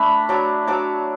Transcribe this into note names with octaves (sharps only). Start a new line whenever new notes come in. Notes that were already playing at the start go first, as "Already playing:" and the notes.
Already playing: A3 D4 A5 B5
F#3 D4
F#3 D4 D6